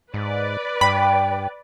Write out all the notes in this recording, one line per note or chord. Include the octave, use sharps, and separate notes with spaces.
G#2 B4 D5
G2 G5 B5